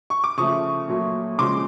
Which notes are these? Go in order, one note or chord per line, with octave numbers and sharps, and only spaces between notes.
C#6
D6
C#3 F3 A3 C#6 D#6
A#2 F#3 A3
C#3 F3 G#3 C6 D6